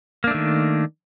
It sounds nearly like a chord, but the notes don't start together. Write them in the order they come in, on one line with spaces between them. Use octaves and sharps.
A#3 D4 A3 D#3